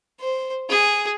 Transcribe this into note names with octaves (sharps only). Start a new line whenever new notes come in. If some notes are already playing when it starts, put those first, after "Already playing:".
C5
G#4